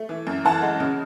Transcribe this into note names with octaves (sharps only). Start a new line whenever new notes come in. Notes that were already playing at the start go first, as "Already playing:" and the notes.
Already playing: A3
E3
F#2
E3 F#5 A5
G#3
C#3